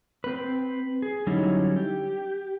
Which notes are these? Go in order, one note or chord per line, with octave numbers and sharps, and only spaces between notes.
C4 B4
G#4
D3 F#3 G3 C#4 D#4 E4
G4